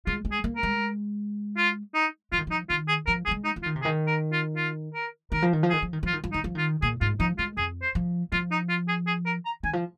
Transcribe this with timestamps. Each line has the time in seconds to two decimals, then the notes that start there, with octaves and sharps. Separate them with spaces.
0.06 G#3 F4
0.25 G#3
0.31 G#4
0.44 A#3
0.56 A#4
0.63 G#3
1.57 F4
1.94 D#4
2.32 F3 F4
2.39 D#3
2.47 F3 D#4
2.70 D#3 F4
2.88 G#4
3.07 F3 A#4
3.25 F3 G#4
3.31 G#3
3.44 D#4
3.56 F3
3.63 F4
3.66 D#3
3.76 C3
3.82 G#4
3.85 D#3
4.07 A#4
4.33 F4
4.57 F4
4.94 A#4
5.32 D#3 A#4
5.42 F3
5.53 D#3
5.63 F3
5.70 D#3 G#4
5.82 F3
5.93 D#3
6.03 F3 F4
6.13 D#3
6.24 F3
6.32 D#3 D#4
6.44 F3
6.55 D#3 F4
6.82 A#2 G#4
7.01 G#2 F4
7.20 F3 D#4
7.38 G#3 F4
7.57 F2 G#4
7.82 C5
7.95 F3
8.32 F3 F4
8.52 D#4
8.69 F4
8.88 G#4
9.07 G#4
9.26 A#4
9.45 A#5
9.63 D#3 G#5
9.73 F3